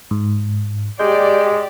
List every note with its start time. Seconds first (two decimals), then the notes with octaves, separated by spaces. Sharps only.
0.11 G#2
1.00 G#3 G4 D5 G6